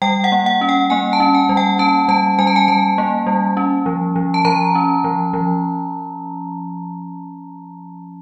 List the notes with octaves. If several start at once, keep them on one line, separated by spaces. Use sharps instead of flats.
G3 G5
F#5
A#3
F#5
C#4
G5
A#3 G#5
A5
C#4
G#5
G3
G5
C#4 A5
G3 A5
G3 G#5
A5
G#5
G3 A5
A#3
G3
C#4
F3
F3
A5
F3 A#5
C#4
F3
F3